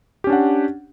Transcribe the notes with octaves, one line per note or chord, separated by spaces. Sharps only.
C#4 D4 G4 F#5